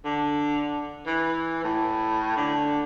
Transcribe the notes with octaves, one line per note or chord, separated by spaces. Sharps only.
D3
E3
A2
D3